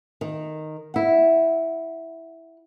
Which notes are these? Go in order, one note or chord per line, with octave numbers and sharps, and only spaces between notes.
D#3
E4 F#5